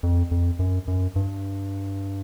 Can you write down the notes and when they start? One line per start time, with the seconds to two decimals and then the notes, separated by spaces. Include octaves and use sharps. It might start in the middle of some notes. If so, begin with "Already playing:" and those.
0.03 F2
0.31 F2
0.59 F#2
0.88 F#2
1.16 G2